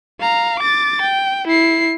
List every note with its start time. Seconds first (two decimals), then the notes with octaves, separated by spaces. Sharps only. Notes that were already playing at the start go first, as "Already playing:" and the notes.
0.20 F5 A#5
0.59 D6 A6
1.02 G5
1.47 E4 C7